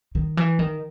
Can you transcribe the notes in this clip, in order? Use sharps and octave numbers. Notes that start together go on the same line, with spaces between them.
D#3
E3
D#3